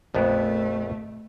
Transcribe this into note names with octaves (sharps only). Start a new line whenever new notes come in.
A#1 F2 A3 B3